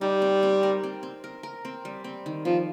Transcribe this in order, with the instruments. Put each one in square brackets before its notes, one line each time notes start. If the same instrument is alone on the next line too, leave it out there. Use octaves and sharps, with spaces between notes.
[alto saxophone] G3 [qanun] D#4
[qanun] C4
C4
A#4
C4
C4
A#4
A#4
C4
G3
C4
D#3
[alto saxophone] F3 [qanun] C4